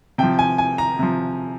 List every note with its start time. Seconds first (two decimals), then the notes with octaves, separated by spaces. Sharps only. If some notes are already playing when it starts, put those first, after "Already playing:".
0.18 C3 F3 G5
0.39 G#5
0.58 G#5
0.78 A#5
0.99 C3 F3